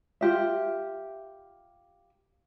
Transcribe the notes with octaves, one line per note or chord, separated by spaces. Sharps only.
F4 G4 E5